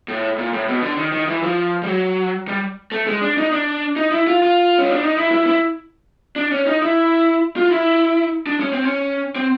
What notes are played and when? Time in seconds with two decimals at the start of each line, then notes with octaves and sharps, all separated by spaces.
0.08 A2
0.38 A#2
0.53 A2
0.68 B2
0.82 D3
0.97 D#3
1.12 D#3
1.27 E3
1.43 F3
1.83 G3
1.87 F#3
2.48 G3
2.92 A3
3.07 G#3
3.21 D4
3.37 D#4
3.52 D4
3.96 D#4
4.11 E4
4.27 F4
4.42 F4
4.78 C#4
4.90 D4
5.03 D#4
5.17 E4
5.31 E4
5.46 E4
6.36 D4
6.52 C#4
6.67 D#4
6.82 E4
7.57 F4
7.71 E4
8.47 D4
8.60 C#4
8.73 C4
8.84 C#4
9.36 C4